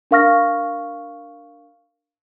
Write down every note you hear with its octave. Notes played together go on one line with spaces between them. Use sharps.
D4 A#4 F5 C#6 F6 A#6